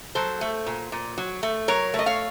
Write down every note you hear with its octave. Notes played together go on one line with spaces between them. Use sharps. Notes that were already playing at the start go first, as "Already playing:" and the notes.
F#3 A4 C5
A3
A#2
A#2
F#3
A3
F#3 A#4 C#5
A3
D#5
C#5 F5